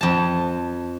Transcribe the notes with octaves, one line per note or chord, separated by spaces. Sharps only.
F2 A5